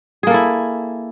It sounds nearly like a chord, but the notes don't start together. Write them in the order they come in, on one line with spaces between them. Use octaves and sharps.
G#4 A#3 A4 E4